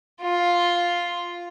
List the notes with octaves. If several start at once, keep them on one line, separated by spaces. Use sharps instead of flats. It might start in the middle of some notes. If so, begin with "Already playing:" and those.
F4